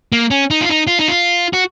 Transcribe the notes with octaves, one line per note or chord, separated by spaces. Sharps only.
A#3
C#4
D#4
F4
D#4
F4
D#4
F4
F#4